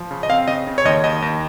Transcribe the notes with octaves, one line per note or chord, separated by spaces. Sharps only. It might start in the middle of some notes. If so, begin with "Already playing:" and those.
Already playing: F3
C#3
D#5
C4 F5
C#3 D#5
C#3
C#5
D#2 D#5
D#2 D#5
D#2